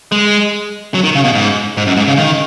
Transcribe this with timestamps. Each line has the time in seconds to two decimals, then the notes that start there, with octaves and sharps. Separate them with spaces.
0.12 G#3
0.94 F#3
1.04 D#3
1.15 C#3
1.24 B2
1.35 G#2
1.77 G#2
1.87 F#2
1.97 G#2
2.07 C#3
2.17 D#3